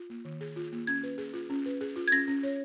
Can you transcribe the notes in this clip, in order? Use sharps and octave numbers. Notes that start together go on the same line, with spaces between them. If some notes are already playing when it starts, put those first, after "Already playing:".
Already playing: F4
A#3
D#3
G#4
F4
A#3
C#4 G#6
B4
G#4
F4
C#4
B4
G#4
F4
G#6
C#4 A#6
C#4
C#5